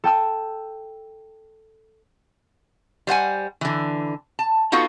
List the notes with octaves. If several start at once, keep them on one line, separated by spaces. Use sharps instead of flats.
A4 G5 A5 E6
G3 C5 F#5 G#5
D3 E3
A5
B3 D#4 F4 F#4 A4